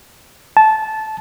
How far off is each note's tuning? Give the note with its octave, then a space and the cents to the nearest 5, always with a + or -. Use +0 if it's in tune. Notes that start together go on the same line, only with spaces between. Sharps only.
A5 -15